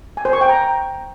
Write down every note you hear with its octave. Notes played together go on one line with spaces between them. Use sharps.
G#5
C5
C#6
G5
A#5